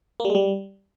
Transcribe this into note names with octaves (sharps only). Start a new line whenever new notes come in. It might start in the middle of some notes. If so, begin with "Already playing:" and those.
A#3
G3
G#3
G3